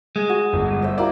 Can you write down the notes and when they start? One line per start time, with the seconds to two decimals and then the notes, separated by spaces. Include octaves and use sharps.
0.16 G#3
0.29 F#4
0.53 G1
0.82 C5 E5
0.98 A#3 E4 F#4 D5